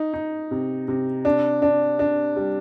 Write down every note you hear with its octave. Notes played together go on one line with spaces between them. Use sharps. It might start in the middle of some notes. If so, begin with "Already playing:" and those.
Already playing: D#4
D#4
C3
C3
D4
D4
D4
G3